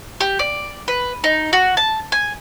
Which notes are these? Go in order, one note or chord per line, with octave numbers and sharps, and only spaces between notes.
G4
D5
B4
D#4
F#4
A5
G#5